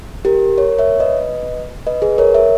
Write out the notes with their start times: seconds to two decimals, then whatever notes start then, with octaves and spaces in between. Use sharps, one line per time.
0.25 G4 A#4
0.58 A#4 C#5
0.78 C#5 E5
1.00 B4 D#5
1.87 B4 D#5
2.02 G#4 B4
2.18 A#4 C#5
2.34 C#5 E5